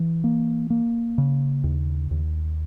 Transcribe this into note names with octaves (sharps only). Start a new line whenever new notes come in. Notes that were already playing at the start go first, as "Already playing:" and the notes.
Already playing: E3
A#3
A#3
C#3
D#2
D#2